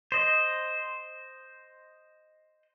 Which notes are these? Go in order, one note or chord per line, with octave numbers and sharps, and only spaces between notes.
C5 D#5